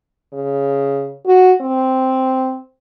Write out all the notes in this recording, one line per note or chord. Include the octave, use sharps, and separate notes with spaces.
C#3
F#4
C4